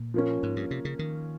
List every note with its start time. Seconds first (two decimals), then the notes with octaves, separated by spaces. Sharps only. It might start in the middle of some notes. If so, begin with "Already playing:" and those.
Already playing: A#2
0.14 F3 A#3 C#4
0.43 G#2
0.56 G2
0.71 C3
0.85 C#3
0.99 D#3